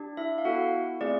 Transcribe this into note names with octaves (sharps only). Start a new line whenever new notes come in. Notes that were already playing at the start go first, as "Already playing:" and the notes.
Already playing: D4 G4
E4 E5
F5
B3 E4 F#4 A4 F#5
A3 C4 F4 G#4 D5